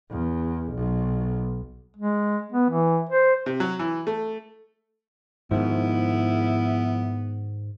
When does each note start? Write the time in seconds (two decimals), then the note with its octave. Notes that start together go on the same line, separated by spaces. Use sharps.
0.10 E2
0.72 B1
1.97 G#3
2.52 B3
2.70 E3
3.09 C5
3.46 C3
3.60 F#3
3.79 E3
4.07 A3
5.51 G#2 D#3 F3 B3 E4